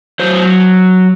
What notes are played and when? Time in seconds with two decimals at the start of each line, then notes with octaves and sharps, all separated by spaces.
0.19 F#3 C5